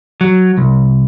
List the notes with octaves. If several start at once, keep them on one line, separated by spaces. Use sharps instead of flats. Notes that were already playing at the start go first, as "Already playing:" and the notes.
F#3
C2